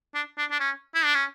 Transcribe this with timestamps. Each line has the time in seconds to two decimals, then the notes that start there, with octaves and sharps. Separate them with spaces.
0.14 D4
0.38 D4
0.51 D4
0.60 C#4
0.95 E4
1.04 D4
1.14 C#4